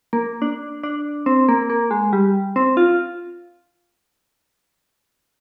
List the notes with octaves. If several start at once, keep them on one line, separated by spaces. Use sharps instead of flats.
A#3
D4
D4
C4
A#3
A#3
G#3
G3
C4
F4